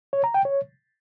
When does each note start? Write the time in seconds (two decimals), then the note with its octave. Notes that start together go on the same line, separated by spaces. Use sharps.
0.13 C#5
0.24 A#5
0.34 G5
0.45 C#5